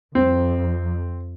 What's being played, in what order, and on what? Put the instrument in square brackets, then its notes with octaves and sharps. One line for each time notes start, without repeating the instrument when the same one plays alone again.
[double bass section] F2 [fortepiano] C4